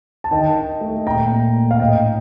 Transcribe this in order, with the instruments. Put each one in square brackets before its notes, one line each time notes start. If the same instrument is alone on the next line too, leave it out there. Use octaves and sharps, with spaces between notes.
[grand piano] A5
D#3 D#5 G5
D#4
A3
A#2 G5 A#5
A#2
A3
F5
A2 D#5 G5